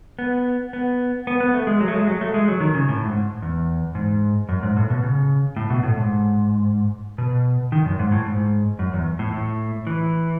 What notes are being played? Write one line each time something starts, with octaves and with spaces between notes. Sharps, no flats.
B3
B3
B3
B3
A3
G#3
F#3
A3
G#3
F#3
A3
G#3
F#3
D#3
C#3
A2
G#2
E2
G#2
F#2
G#2
A2
B2
C#3
A2
B2
A2
G#2
B2
D#3
F#2
G#2
A2
G#2
F#2
E2
A2
A2
E3